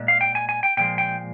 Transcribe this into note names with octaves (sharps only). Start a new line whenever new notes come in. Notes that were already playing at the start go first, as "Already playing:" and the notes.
Already playing: A#2 G#3
F5
G5
G#5
G#5
G5
A#2 F3 G#3 G5
G5